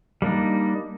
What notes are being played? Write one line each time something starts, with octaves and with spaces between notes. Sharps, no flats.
G3 A#3 D4 D#4